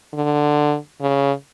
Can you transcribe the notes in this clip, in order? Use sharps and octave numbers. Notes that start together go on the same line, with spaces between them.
D3
C#3